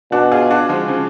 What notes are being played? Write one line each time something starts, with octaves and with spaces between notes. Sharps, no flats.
B2 D4 F#4
F4 G#4
D4 F#4
F3 G#3
C#3 F3